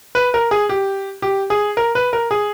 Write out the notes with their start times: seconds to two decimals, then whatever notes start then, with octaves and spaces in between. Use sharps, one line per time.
0.15 B4
0.34 A#4
0.51 G#4
0.69 G4
1.22 G4
1.50 G#4
1.77 A#4
1.95 B4
2.13 A#4
2.31 G#4